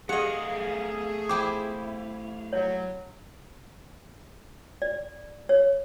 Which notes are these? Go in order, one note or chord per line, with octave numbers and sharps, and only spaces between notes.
A3 G4 G#4 D#5 F5 F#5
E4 G4 C5 D6
F#3 C#5
D5
C#5